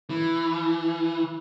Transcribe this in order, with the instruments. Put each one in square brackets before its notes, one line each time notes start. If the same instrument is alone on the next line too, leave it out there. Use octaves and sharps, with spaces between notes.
[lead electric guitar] E3